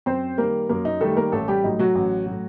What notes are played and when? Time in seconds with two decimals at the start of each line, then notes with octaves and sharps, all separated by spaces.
0.06 F#2 C4 C5
0.38 D#3 G3 A#3 A#4
0.69 F#2 A#3 A#4
0.85 D#4
1.01 D#3 G3 A3 A4
1.17 A#3 A#4
1.32 A1 A3 A4
1.48 G3 G4
1.64 A2 F#3 D#4
1.79 F#3 F#4
1.95 A1
2.26 A2 F#3